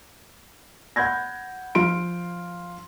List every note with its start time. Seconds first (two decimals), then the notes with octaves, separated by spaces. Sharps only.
0.96 F#5 B5 G6 G#6 A#6
1.75 F3 F4 C6 D7